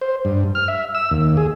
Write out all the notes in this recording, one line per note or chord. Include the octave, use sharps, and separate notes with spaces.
C5
G2
F6
E5
E6
D#2
G#4